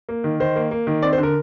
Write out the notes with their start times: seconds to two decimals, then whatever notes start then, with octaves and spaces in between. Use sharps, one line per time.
0.09 A#3
0.24 D#3
0.40 D#3 C5
0.56 A#3
0.71 A#3
0.87 D#3
1.02 C4 D5
1.13 C5
1.18 D3
1.23 A#4